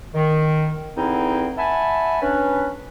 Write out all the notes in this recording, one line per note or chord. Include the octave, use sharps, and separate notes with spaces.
D#3
E2 D3 C4 D#4 E4
E5 F#5 G#5 A5 B5
C#4 D4 B4